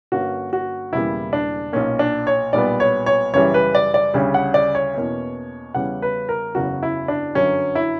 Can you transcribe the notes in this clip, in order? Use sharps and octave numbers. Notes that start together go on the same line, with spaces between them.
G2 D3 A#3 C#4 F#4
F#4
E1 E2 C#3 G3 A#3 E4
D4
B1 A#2 A#3 C#4
D4
C#5
B1 A#2 G3 B3 D5
C#5
C#5
F#2 C#3 E3 G3 C#5
B4
D5
D5
D2 C#3 G3 C#4
F#5
D5
C#5
E2 B2 A#3 C#4
E2 C#3 G3 C#4 F#5
B4
A#4
F#1 E2 C#3 F#3 C#4 F#4
E4
D4
G1 F#2 D3 F#3 C#4
E4